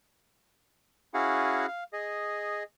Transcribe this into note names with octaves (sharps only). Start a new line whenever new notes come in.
C#4 E4 F#4 G#4 F5 F#5
F5
G#4 D#5